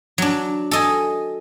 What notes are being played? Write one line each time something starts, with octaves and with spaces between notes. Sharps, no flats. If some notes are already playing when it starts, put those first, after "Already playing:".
F#3 D4
A4 D#5 G#5